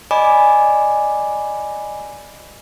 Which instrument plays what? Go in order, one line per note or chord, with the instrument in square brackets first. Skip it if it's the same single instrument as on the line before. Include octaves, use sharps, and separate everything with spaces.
[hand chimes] D5 D#5 G#5 B5 D6